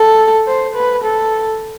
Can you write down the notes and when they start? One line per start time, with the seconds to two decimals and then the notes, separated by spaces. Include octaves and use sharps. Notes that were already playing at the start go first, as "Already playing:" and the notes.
Already playing: A4
0.47 C5
0.76 B4
1.04 A4